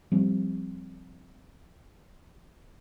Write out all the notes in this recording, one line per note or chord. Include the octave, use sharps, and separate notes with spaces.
F3 G3 C4